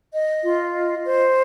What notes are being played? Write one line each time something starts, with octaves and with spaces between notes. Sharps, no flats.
D#5
F4
D#5
C5